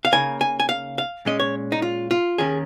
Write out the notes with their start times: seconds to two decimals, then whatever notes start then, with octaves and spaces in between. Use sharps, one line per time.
0.05 F5
0.12 C#3 A#3 D#4 G#5
0.41 G#5
0.60 G#5
0.69 F5
0.98 F5
1.25 A#2 G#3 C#4 D#5
1.40 C#5
1.72 D#4
1.82 F4
2.11 F4
2.38 D#2 D#3 C#4 G#4